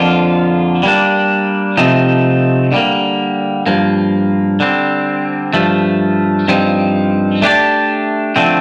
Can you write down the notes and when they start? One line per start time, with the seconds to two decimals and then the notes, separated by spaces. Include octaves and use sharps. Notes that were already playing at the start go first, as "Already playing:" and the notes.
Already playing: F2 D3 F3 A#3 F4
0.83 G3 A#3 D4
1.77 C3 F3 A3 C4 D#4
2.72 D3 G3 A#3
3.66 G2 F3 A#3
4.60 D3 G3 C4
5.53 G2 F3 A3
6.48 G2 F3 C4 D#4
7.42 A3 D4 G4 D5
8.36 D3 F3 A3 C4